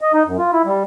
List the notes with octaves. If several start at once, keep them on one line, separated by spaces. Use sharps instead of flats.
D#5
D#4
F#2
F4
E4
G3